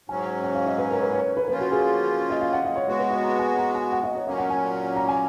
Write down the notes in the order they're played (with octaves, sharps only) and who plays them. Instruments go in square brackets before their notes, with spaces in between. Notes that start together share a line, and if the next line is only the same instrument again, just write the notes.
[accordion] G#2 F#3 C#4 [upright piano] G#5
[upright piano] F#5
F5
D#5
B4
A#4
B4
C#5
B4
[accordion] F3 A#3 C#4 F4 [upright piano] B4
[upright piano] F#4
G#4
D#5
F5
F#5
D#5
C#5
[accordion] G#3 B3 F#4 [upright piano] C#5
[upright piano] B4
D#5
A#5
G#5
A#5
G#5
F#5
D#5
C#5
[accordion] A#2 F#3 A#3 C#4 [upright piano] D#5
[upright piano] F#5
G#5
A#5
G#5